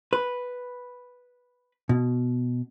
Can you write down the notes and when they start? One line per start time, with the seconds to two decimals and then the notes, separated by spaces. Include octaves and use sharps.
0.13 B4
1.89 B2